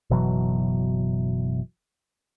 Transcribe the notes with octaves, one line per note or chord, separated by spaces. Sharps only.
F#1 B2 E3 F#3